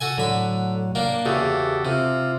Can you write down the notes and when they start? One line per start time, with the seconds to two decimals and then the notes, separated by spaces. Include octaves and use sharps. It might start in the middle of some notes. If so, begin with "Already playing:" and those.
0.01 F#4 A4 G#5
0.18 A2 D3 F#3 B5
0.95 A#3 D4
1.26 E2 C#3 F#4 G4 A4
1.85 C3 F4